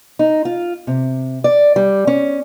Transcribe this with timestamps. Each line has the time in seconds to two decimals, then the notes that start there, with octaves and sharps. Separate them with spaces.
0.19 D#4
0.45 F4
0.87 C3
1.44 D5
1.76 G3
2.07 C#4